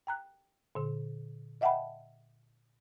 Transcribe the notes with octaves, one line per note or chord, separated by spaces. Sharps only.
G5 A#5 F#6
A#2 D3
D#5 E5 F#5 G5 A5 B5